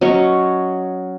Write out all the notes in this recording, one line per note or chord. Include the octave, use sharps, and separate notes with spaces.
F#3 C#4 D#5 C#6